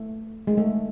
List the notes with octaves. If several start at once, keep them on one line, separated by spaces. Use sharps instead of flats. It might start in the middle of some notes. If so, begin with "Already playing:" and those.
Already playing: A3
G#3
A3